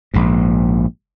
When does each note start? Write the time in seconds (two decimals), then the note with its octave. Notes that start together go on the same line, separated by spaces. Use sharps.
0.14 A#1 G#2